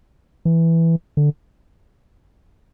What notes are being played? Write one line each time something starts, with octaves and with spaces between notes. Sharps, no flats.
E3
D3